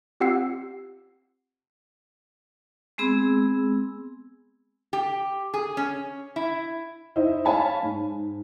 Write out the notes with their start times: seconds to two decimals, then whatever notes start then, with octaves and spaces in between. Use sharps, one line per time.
0.20 C4 F4 G4 F#5 E6 C7
2.98 G#3 B3 C4 G#4 E6
4.93 G4
5.54 G#4
5.77 C#4
6.36 E4
7.16 D#4 E4 C5
7.45 C#5 F5 G#5 A5 B5
7.83 G#2